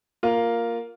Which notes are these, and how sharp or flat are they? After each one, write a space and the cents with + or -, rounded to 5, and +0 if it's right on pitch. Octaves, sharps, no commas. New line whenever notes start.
A#3 +0 F4 +0